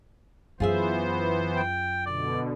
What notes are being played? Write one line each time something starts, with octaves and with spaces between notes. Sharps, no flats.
F#2 E3 B3 F4 G#4 C5 E5
G5
B2 D3 D5